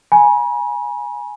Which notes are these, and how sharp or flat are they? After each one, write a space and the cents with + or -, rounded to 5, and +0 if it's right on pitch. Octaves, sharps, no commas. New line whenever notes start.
G#5 +0 B5 -45